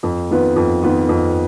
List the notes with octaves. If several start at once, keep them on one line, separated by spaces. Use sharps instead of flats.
F2
D#3 B3 F4 B4
F2
D#3 B3 F4 B4
F2